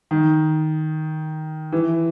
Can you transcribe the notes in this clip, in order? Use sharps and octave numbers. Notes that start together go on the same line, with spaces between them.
D#3
E3